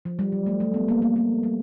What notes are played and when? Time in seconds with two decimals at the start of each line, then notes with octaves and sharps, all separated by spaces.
0.05 F3
0.19 G3
0.32 F#3
0.46 A3
0.60 A3
0.74 B3
0.88 A#3
1.02 A#3
1.16 A#3
1.43 G3